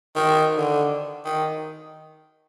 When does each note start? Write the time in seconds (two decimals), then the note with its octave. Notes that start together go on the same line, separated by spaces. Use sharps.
0.16 D#3
0.57 D3
1.25 D#3